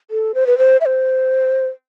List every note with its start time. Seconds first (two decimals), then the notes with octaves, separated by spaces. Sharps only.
0.11 A4
0.35 C5
0.47 B4
0.58 C5
0.81 E5
0.86 C5